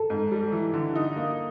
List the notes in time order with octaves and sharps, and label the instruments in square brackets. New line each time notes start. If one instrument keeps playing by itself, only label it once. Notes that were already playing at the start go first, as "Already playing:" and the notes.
Already playing: [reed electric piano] A4
[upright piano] G#2
G3
E3
D3
D#4
A#3